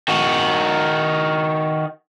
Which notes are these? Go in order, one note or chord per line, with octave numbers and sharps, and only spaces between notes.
D#3 F#4